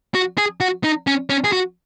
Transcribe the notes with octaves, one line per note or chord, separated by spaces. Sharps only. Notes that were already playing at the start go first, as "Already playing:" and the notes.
F#4
G#4
F#4
D#4
C#4
C#4
G#4
F#4